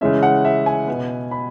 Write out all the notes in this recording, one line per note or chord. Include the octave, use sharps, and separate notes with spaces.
C#3 E3 G#3 C#4 E5
F#5
E5
G#5
B2 B3
B5